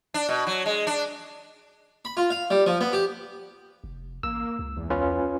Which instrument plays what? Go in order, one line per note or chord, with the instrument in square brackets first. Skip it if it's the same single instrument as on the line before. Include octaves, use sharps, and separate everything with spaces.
[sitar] D4
B2
F#3
G#3
D4
[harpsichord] B5
F4
F5
G3
F3
B3
G4
[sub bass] F1
[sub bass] A1 [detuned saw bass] A#3 [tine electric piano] E6
[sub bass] C#2
[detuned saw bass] E2
[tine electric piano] C#4 F4 B4